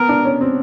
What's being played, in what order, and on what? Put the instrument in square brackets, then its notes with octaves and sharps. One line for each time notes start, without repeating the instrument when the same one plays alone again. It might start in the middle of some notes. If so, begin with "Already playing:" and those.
Already playing: [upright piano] B3 [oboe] A#4
[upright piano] D4
C#4
C4